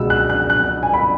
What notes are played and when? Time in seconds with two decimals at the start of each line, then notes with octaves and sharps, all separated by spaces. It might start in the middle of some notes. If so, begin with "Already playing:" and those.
Already playing: C#2 B2 G#3 B3 E6
0.10 F#6
0.30 F#6
0.50 F#6
0.83 G#5
0.94 B5